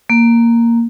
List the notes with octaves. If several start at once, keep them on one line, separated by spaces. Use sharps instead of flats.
A#3